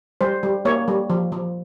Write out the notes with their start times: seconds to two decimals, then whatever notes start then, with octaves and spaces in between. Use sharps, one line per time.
0.21 G3 C5
0.43 G3
0.65 A#3 C#5
0.88 G3
1.10 F3
1.32 F3